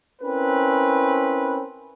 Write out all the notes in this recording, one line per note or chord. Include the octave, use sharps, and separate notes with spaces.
C4 C#4 E4 A#4 B4